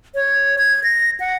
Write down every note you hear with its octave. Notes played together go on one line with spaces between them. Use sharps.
C#5
G#6
A#6
F#5